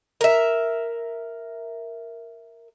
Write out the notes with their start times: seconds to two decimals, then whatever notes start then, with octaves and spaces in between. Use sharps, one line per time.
0.21 A#4 E5